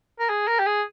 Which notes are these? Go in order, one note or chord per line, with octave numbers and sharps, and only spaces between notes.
A#4
G#4
A#4
G4
G#4